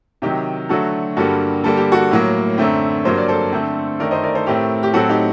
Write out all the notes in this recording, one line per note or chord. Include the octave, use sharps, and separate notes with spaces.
C3 D#3 F#3 D#4 G4
D3 F#3 A3 F#4 A4
G2 D3 G3 A#3 F#4 A4
D3 G3 A#3 A4
G4
F#4 A4
A2 F#3 A#3
F#2 D3 A3 C4
G2 F#3 A#3 C5
D5
A4 C5
D3 A3 C4
F#2 D#3 A3 A#4 D5
C5 D#5
A#4 D5
A4 C5
A2 A3 C4 G4 A#4
G4
A2 F#3 C4 F#4 A4
D#4 G4